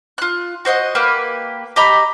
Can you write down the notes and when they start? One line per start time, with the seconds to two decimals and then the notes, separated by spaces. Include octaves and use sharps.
0.18 F4 F#6
0.65 F#4 C5 D#5 F#5
0.95 A#3 G4 B4
1.76 G4 D#5 A#5 B5